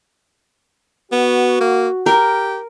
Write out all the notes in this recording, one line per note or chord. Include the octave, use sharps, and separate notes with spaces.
B3 F#4
A#3
G4 A#4